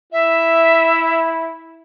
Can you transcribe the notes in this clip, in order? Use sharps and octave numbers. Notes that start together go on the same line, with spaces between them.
E4 E5